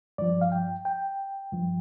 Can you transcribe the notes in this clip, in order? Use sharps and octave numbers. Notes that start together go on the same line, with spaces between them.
G2 F3 D5
F5
G5
G5
G2 F3